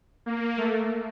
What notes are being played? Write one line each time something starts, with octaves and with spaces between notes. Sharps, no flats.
A#3
A3